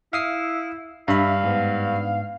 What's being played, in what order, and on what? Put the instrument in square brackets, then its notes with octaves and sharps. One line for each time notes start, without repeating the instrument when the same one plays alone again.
[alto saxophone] E4 [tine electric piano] F5 D#6 C7
[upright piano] G2 [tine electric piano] E5 B5 [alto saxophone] F5
[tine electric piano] G#2 B3